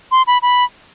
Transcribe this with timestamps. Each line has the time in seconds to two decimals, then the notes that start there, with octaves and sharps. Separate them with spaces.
0.12 C6
0.27 B5
0.42 B5